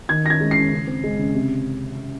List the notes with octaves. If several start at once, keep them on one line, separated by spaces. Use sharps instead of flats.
D#3 G#6
C#4 A#6
G#6
G#3
D#3 C7
C#3
C4
G#3
C#3
C3